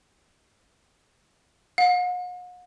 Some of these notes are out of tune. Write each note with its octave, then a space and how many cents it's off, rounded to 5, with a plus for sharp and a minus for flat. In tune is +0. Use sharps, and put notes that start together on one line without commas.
F#5 -45